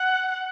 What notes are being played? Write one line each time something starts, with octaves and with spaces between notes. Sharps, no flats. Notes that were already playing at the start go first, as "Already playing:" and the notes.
Already playing: F#5